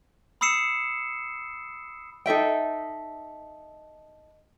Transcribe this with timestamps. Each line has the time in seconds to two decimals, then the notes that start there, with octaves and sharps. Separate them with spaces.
0.41 B5 D#6 E6 C7 C#7 E7
2.26 D#4 A4 E5 G5